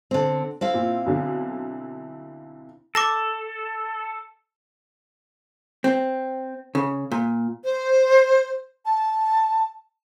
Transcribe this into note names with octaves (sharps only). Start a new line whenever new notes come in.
D3 C4
C4 E4 F5
A#2
B1 D3
A4 D6 A#6 E7
C4
C#3
A#2
C5
A5